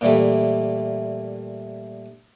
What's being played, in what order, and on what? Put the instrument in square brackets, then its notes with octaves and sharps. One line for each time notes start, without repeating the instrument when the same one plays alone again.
[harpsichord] A#2 E3 G3 A3 E5